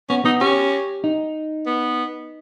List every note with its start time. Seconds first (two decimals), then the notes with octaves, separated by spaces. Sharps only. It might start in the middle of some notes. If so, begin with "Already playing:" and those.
0.10 B3 C#4
0.25 B3 D#4
0.40 C#4 G4
1.04 D#4
1.66 B3